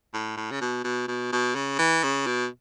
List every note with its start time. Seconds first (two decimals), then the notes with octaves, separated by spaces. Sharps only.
0.14 A2
0.37 A2
0.51 C#3
0.61 B2
0.84 B2
1.08 B2
1.32 B2
1.55 C#3
1.79 E3
2.04 C#3
2.26 B2